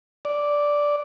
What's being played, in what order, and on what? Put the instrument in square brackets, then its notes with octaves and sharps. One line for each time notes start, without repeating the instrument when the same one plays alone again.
[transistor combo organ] D5